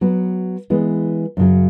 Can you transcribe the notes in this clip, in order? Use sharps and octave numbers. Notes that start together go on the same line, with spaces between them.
F#3 B3 F#4 B4
E3 G#3 B3
F#2 C#3 F#3